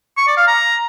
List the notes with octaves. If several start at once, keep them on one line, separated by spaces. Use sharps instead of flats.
C#6
D5
F5
A#5